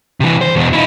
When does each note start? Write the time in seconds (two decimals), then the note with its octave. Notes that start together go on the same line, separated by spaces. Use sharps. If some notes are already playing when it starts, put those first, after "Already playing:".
0.20 C3 E3
0.41 C5
0.56 E2 B2
0.73 D#4 E4